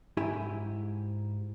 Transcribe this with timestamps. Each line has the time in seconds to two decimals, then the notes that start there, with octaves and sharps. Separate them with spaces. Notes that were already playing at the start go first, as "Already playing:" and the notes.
0.17 G#2 E4 G4 E5 G#5